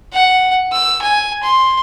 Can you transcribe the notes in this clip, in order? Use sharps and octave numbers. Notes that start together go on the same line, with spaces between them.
F#5
E6
G#5
C6